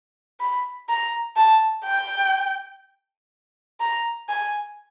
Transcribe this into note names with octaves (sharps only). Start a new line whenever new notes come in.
B5
A#5
A5
G5
A#5
G#5